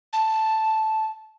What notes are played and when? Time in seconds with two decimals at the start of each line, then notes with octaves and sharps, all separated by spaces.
0.13 A5